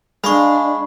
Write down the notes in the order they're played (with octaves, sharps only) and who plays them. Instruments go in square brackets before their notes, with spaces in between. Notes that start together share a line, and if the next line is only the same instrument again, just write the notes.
[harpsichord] G#3 [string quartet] D4 [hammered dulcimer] F5 [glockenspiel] B5 C#6